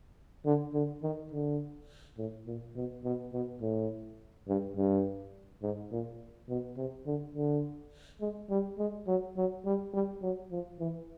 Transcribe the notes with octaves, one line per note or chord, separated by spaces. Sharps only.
D3
D3
D#3
D3
A2
A#2
B2
B2
B2
A2
G2
G2
G#2
A#2
B2
C3
D3
D3
G#3
G3
G#3
F#3
F#3
G3
G3
F#3
F3
E3